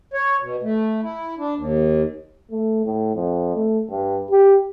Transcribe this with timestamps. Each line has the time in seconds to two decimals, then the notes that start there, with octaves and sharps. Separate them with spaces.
0.14 C#5
0.42 B2
0.63 A3
1.03 E4
1.38 D4
1.56 D#2
2.51 A3
2.85 A2
3.15 F2
3.55 A3
3.89 G2
4.31 G4